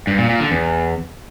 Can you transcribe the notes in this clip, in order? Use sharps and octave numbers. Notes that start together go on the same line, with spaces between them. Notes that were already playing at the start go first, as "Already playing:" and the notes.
G2
A#2
A#2
D3
E2